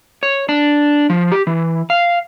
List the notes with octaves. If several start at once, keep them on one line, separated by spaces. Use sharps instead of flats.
C#5
D4
F3
G4
E3
F5